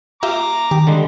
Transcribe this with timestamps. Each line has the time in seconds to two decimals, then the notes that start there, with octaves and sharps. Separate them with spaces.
0.23 F4 G4 E5 A#5 D6
0.71 D#3 G4
0.87 D3 G3 G#3